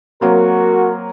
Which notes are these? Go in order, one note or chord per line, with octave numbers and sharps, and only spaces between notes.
F#3 A#3 C4 F#4 A#4